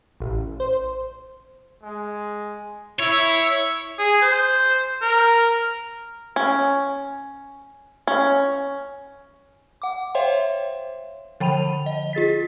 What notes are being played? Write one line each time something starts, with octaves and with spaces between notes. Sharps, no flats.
A1
C5
G#3
E4 C#5
G#4
C5
A#4
C#4
C#4
F#5 D6
C5 C#5 E5 F5 G5 C6
D3 F3 G5 B5 D#7 F7
D#5
F4 G#4 A6 B6